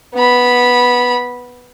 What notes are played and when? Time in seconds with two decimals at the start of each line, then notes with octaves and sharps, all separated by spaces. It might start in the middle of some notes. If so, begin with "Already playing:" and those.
0.14 B3 B5